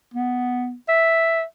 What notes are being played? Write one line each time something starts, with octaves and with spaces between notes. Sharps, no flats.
B3
E5